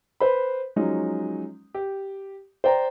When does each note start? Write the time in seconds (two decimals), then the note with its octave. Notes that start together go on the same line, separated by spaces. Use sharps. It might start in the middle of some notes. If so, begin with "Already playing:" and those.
0.20 B4 C5 B5
0.76 F3 F#3 G#3 C#4 D#4
1.74 G4
2.64 C5 D5 G5 A#5